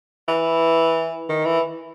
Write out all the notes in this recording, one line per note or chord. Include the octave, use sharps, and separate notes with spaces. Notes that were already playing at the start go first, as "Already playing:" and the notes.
E3
D#3
E3